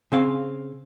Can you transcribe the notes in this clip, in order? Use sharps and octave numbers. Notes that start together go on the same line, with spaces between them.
C#3 C4 F5